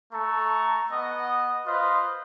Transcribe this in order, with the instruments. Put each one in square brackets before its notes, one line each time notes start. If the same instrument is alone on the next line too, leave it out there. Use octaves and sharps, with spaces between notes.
[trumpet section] A3 A4 A#5 C#6
B3 D#5 F#5 D#6
F4 B4 C5 D#5